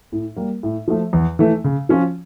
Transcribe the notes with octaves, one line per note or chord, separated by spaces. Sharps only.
A2
G3 A#3
A2
F3 A3
E2
E3 A3
C#3
F3 C#4 F4